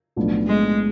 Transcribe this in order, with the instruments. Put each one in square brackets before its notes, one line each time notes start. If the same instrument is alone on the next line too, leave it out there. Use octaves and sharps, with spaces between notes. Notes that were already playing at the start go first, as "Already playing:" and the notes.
[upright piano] B1 A2 F3 B3 D4
[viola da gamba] G#3